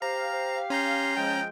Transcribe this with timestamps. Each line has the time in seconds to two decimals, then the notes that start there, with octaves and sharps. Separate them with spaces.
0.02 G4 C5 F5 A#5
0.33 C5
0.70 C#4 A#5 C6 G6
1.17 F3 G#3 G5